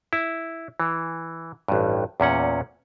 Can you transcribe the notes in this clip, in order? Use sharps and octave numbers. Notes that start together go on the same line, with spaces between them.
E4
E3
A1 G2
E2 A#2 C#4 F#5